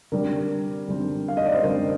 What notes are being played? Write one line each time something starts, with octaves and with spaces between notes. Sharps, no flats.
D3 G3 C4 A#4
D3 G3 C4
F5
D#5
D5
C5
D3 G3 C4 A#4